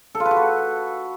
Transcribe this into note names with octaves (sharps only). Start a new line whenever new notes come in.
A4
F4
B4
F#4
B4